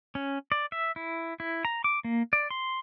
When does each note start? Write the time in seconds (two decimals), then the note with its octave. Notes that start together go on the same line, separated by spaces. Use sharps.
0.15 C#4
0.52 D5
0.72 E5
0.96 E4
1.40 E4
1.65 A#5
1.84 D6
2.04 A#3
2.33 D5
2.50 C6